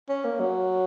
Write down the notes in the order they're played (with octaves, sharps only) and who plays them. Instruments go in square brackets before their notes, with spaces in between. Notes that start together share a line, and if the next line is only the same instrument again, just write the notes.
[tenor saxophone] C#4
A#3
F#3